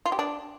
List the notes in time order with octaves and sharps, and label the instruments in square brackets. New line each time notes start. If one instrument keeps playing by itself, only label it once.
[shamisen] F4
G4
D4